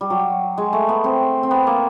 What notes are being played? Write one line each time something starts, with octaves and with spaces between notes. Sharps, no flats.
G3
F#3
G#3
A3
B3
C4
C4
B3
A#3